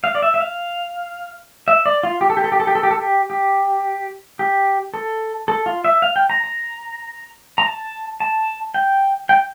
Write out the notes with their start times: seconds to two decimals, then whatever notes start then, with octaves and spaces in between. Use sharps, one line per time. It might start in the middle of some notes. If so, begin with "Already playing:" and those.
0.04 F5
0.15 D5
0.22 E5
0.34 E5
0.40 F5
1.68 E5
1.86 D5
2.03 F4
2.21 G4
2.30 A4
2.37 G4
2.44 A4
2.52 G4
2.60 A4
2.67 G4
2.75 A4
2.83 G4
2.91 A4
2.98 G4
3.30 G4
4.39 G4
4.94 A4
5.48 A4
5.66 F4
5.84 E5
6.02 F5
6.16 G5
6.30 A#5
6.44 A#5
7.58 A#5
7.66 A5
8.20 A5
8.74 G5
9.29 G5